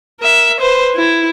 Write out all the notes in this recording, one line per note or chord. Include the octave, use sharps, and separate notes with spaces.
A#4 E5
B4 C5
E4